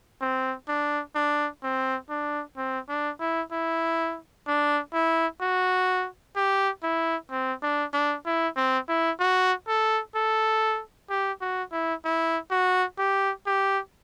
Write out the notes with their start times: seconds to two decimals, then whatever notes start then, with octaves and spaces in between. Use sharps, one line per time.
0.22 C4
0.69 D4
1.15 D4
1.64 C4
2.10 D4
2.57 C4
2.89 D4
3.20 E4
3.52 E4
4.47 D4
4.94 E4
5.41 F#4
6.36 G4
6.83 E4
7.31 C4
7.63 D4
7.93 D4
8.26 E4
8.57 C4
8.89 E4
9.20 F#4
9.68 A4
10.15 A4
11.10 G4
11.41 F#4
11.72 E4
12.05 E4
12.51 F#4
12.99 G4
13.47 G4